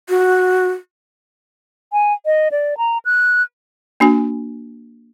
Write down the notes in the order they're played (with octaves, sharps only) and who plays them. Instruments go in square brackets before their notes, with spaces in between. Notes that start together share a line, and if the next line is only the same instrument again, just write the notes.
[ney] F#4
[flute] G#5
D#5
D5
A#5
F#6
[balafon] A#3 D4 F#4 G#5